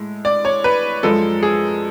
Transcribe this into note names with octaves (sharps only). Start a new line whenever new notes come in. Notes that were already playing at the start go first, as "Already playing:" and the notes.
Already playing: A2 G#3
D5
C#5
B4
F#2 F3 G#3 A4
G#4